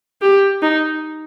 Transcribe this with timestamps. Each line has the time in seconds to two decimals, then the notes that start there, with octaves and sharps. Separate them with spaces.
0.22 G4
0.62 D#4